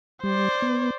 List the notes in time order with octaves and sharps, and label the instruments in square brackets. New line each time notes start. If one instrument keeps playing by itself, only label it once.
[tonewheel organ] G3 [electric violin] C5 D5
[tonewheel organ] B3